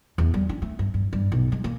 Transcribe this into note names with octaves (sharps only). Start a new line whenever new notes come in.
E2
G3
D4
A3
G2
G2
G2
B1
G#3
A#3